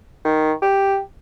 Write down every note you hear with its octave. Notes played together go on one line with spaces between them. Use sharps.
D#3
G4